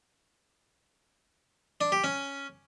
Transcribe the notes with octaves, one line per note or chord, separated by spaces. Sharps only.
D4
G4
C#4